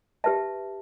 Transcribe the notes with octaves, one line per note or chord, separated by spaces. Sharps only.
G4 B4 E5 A5